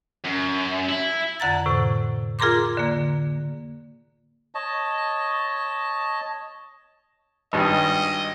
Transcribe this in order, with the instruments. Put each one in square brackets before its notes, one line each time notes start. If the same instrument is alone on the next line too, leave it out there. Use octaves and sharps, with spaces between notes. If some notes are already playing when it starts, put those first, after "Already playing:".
[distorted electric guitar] F#2
E4
[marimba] F2 D3 F#5 A#5 A6
A2 C3
F4 G#4 A#4 A#5 C6 D6
D3 A#3
[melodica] C#5 D#5 A5
[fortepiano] G#1 G2 [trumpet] D#5